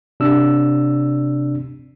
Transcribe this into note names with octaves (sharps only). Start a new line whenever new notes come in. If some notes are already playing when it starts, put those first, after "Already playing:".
C3 D4 E6